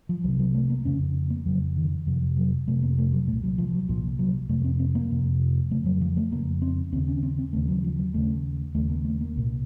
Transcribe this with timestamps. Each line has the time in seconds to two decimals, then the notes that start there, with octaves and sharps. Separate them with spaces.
0.09 F3
0.24 C2 F#3
0.28 C3
0.39 F#3
0.54 A3
0.70 A#3
0.85 F2 C#3 C#4
1.30 A#3
1.46 F2 C#3 F#3
1.77 D#3
2.06 F2 C3 F3
2.37 F#3
2.67 F2 C3 A3
2.82 A#3
2.98 A3
3.13 F#3
3.27 A#2 A3
3.32 C2
3.44 F#3
3.58 F3
3.73 F#3
3.89 C2 A#2 F3
4.19 F#3
4.49 F2 C3 A3
4.64 C4
4.80 C4
4.95 A#3
5.11 F2 C3
5.71 F2 C#3 A3
5.86 F#3
6.01 F3
6.17 A3
6.32 F2 C#3 A#3
6.62 C4
6.93 D#2 C#3 C4
7.07 C#4
7.23 C4
7.39 C4
7.53 D#2 C#3 A3
7.68 F#3
7.84 F3
7.99 F#3
8.14 D#2 C#3 A3
8.75 D#2 A3
8.78 C#3
8.90 A#3
9.05 A3
9.21 A#3
9.36 C2 A#2